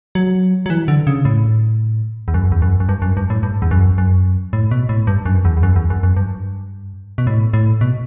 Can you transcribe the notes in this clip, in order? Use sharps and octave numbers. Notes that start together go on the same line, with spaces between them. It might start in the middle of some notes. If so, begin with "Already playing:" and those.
F#3
F#3
E3
D3
C#3
A2
E2
F#2
E2
F#2
F#2
G2
F#2
G2
A2
G2
E2
F#2
F#2
A2
B2
A2
G2
F#2
E2
E2
F#2
E2
F#2
F#2
G2
B2
A2
A2
B2